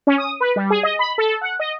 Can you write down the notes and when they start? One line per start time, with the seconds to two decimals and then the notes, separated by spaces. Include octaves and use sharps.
0.07 C#4
0.18 D#6
0.40 B4
0.56 G3
0.70 G#4
0.83 D#5
0.99 B5
1.18 A4
1.41 F#5
1.60 D#5